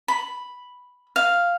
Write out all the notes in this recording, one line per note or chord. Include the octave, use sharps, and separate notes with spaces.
B5
F5